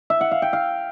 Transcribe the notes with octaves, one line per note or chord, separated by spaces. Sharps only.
E5
F#5
F5
G5
F5